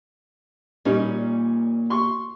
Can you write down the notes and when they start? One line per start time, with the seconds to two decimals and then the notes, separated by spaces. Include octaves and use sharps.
0.85 A#2 G3 C#4 D#4
1.90 C6 C#6